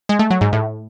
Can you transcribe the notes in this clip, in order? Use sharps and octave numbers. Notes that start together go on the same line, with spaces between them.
G#3
A3
F#3
G#2
A2